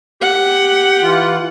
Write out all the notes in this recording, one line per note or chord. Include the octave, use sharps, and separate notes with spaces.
G4 F#5
E3 F4